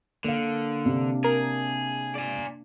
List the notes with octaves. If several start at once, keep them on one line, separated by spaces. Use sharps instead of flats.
D3 A#3 F5
C3 D4
G#4 A#4
D5 G#5